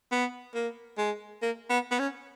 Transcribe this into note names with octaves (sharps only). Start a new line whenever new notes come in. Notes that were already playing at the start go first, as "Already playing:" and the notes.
B3
A#3
G#3
A#3
B3
B3
C#4